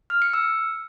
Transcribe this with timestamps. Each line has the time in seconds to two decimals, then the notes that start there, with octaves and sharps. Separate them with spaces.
0.10 F6
0.22 C#7
0.33 E6